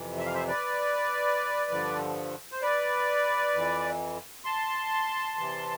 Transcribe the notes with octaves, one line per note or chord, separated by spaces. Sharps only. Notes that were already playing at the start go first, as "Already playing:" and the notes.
Already playing: F2 C3 E3
E5
F5
C5 E5
B4 D5
G2 D3 F3
C5
B4 D5
F2 E3
A5 C6
E2 C3 E3